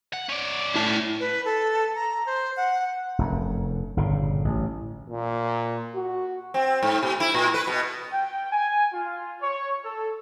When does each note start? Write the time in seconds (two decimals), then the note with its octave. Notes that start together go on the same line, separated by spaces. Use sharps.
0.13 F#5
0.29 C#4 D5
0.76 E4 A5
1.20 B4
1.45 A4
1.95 A#5
2.26 C5
2.57 F#5
3.18 F1 F#2
3.97 G1 A#2 C#3
4.45 A1
5.08 A#2
5.95 F#4
6.54 C4
6.83 G#2
7.03 B2
7.20 E4
7.34 A#2
7.54 B4
7.67 B2
8.12 G5
8.51 G#5
8.93 F4
9.42 C#5
9.84 A4